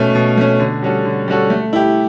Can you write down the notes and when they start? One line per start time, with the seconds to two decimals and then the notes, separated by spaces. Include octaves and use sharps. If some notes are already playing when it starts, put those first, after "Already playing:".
Already playing: B2 A3 C#4
0.15 B2
0.37 A3 C#4
0.59 D3
0.83 G3 C#4 F#4 A4
1.05 D3
1.28 G3 C#4 F#4 A4
1.50 A3
1.73 E4 G4